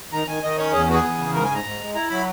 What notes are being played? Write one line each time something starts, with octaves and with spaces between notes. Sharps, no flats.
D#3 A#5
D#3 G#5
D#3 D#5
C#4 C#5
E2 G#4
B3 F#4
G#4
E2
C#3
G#2 A#4
G#5
G#2 A#5
G#2
G#3
E4 A#5
F#3 B5